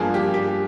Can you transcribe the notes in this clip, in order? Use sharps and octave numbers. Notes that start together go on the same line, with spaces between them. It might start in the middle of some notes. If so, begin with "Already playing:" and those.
Already playing: G2 F3 A#3 G#4
G4
G4